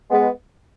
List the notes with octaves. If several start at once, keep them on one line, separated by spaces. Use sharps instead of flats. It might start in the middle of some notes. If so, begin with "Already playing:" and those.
G#3 B3